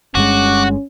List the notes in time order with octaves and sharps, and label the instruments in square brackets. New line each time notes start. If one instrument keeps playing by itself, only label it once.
[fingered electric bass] G1 G2 G#3 [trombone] C#4 [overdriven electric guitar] F#4 [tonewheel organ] C#6 D6 F#6